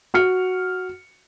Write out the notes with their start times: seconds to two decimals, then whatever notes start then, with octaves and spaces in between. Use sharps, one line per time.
0.14 F#4 F6 C#7